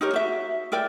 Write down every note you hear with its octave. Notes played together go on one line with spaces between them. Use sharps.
D#4 G4 A#4 C#5
F#4 E5
E4 A#4 D5 G5